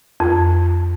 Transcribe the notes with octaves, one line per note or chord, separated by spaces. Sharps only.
F2